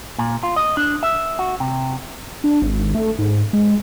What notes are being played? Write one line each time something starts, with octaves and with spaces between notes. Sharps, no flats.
A#2
F4
D#5
D4
E5
F#4
C3
D4
G#1
A3
G#2
G#3